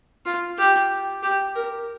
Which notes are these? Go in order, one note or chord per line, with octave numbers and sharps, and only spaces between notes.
F4
G4
G4
A#4